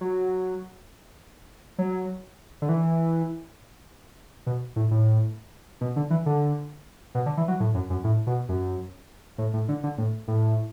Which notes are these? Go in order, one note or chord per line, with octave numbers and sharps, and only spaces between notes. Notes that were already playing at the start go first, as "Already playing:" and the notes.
F#3
F#3
D3
E3
B2
A2
A2
B2
D3
E3
D3
B2
D3
E3
F#3
A2
F#2
F#2
A2
B2
F#2
A2
A2
D3
D3
A2
A2